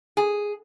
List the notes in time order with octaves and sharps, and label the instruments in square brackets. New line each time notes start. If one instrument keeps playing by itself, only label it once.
[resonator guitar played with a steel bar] G#4